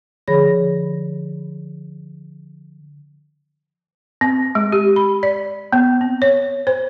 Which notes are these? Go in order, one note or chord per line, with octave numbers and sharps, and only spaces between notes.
D3 F3 G#4 C#5 B5 A#6
C4
G#3
G4
B5
D5
B3
C4
C#5
C5